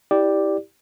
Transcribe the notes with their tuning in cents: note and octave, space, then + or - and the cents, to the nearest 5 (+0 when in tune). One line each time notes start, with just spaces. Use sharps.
E4 -25 G4 +0 D5 +0